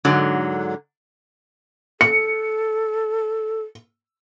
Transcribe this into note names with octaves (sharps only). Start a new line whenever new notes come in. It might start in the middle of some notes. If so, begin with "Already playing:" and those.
G#2 D3 F#3
A4 C#7